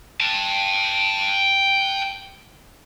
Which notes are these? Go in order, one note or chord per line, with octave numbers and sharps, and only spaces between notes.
G5 A5